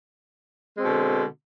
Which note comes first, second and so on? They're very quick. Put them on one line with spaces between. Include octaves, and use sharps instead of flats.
G#3 C4 B2 D3